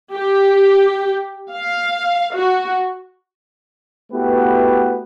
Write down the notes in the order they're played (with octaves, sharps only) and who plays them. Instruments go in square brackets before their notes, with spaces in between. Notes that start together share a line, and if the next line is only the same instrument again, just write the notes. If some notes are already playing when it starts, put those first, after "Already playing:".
[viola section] G4
F5
F#4
[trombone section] A3 B3 E4 F#4 G4 B4